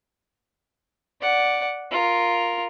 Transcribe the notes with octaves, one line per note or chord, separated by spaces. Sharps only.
D5 F#5
F4 A#4